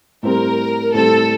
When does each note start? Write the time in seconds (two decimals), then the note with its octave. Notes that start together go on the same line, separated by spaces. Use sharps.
0.23 A2 G3 C4 G4 A#4
0.94 A2 G3 C4 G4 A4